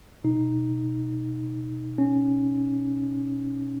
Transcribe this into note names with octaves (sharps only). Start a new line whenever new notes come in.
B2 D#4
C#4